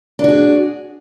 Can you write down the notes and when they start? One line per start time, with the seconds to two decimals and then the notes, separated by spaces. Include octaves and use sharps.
0.19 D4
0.24 F#4
0.29 G#4